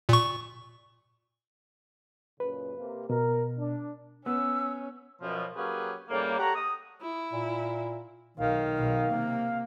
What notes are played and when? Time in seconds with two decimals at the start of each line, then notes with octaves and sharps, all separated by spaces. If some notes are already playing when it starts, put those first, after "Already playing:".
0.09 A#2 C#6
2.40 F#2 A#2 C#3 B4
2.77 C3 A#3
3.10 B2 A#4
3.59 D4
4.26 B3 C#4 E6
5.22 F#2 B2 F3
5.56 F#3 A#3 C#4 G4 G#4 B4
6.10 A2 C#3 G3 A#3
6.39 G4 A4 C#5 F#5 A#5
6.54 D#6
7.01 E4
7.33 A#2
8.37 B1 D#3 F5
8.77 B1 B2
9.07 C3 A#3